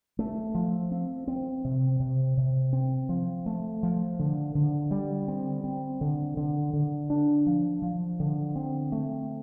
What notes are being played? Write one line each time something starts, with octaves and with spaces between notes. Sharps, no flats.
A3
F3
C4
C4
C3
C3
C3
C4
F3
A3
F3
D3
D3
G3
C4
C4
D3
D3
D3
D4
F3
F3
D3
C4
A3